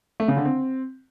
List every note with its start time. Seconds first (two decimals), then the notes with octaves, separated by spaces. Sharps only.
0.20 A3
0.28 C#3
0.37 D3
0.45 C4